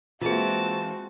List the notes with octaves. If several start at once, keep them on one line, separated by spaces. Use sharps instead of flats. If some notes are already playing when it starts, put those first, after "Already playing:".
E3 G#3 A#3 C4 F4 F#4 G#4 A5